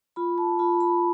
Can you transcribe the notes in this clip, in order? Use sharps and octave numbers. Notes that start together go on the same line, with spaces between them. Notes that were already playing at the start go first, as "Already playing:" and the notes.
F4 B5
A5
F4 B5
B5